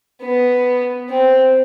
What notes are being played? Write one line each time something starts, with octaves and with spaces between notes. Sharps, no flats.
B3
C4